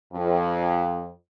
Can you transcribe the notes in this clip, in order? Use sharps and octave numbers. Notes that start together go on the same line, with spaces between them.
F2